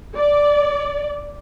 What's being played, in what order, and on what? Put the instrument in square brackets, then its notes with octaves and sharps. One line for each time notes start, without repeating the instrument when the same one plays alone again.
[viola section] D5